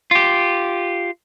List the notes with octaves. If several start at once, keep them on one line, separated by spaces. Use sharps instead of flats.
F4 G4